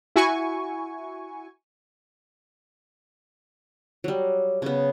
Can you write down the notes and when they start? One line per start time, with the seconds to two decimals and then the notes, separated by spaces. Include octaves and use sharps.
0.16 E4 F#4 G#5 C#6
4.04 F#3 G3
4.62 C#3 B3